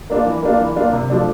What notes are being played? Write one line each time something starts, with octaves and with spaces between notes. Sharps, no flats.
A#3 D4 F4
E3
A#3 D4 F4
E3
A#3 D4 F4
C3
F3 A3 D4